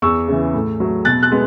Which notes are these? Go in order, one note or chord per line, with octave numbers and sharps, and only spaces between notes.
E2 C#6 E6
C#3 E3
A2
F#3 A3
B2 F#6 A6
F#6 A6
G#3 B3